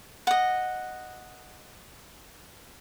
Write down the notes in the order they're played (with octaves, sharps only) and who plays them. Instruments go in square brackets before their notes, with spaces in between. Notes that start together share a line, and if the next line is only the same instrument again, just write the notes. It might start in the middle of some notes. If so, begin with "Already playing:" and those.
[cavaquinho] D#5 F#5